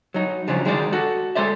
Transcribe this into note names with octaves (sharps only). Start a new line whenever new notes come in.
F#3 D#4
C#3 F3 F#3 D4
D#3 G#3 D#4 A4 C5 D5
F#4 A4
G#3 A4 C5 D5 E5